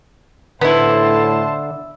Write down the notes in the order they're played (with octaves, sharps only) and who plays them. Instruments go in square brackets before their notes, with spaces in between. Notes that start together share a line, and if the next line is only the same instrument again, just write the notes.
[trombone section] A2 [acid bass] D3 [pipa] B3 E4 [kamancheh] C5 A5